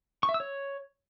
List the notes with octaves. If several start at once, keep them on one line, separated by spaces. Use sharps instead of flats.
C#6
E5
E6
C#5